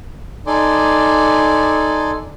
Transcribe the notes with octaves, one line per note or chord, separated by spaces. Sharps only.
D#4 A4 D5 G#5 C6 D6